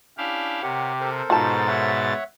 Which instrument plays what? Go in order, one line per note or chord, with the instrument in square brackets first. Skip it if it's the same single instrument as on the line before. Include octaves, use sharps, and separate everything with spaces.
[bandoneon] C#4 D4 [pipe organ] E4 G4 F5
[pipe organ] C3 [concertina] G4 [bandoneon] A#4 C#5 F#5
[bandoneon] A4 A#4 C5
[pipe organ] G#2 B2 A6 [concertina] D#4 F#4 [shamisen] F4 A5
[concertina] C#5 E5 F#5